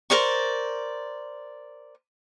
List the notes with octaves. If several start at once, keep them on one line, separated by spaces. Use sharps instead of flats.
A#4 C5 D5 C#6